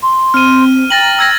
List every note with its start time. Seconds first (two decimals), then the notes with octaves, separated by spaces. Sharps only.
0.03 C6
0.34 C4 F6 D#7
0.90 G5 A#5 A6 A#6 F#7
1.19 E6 G#6 A#6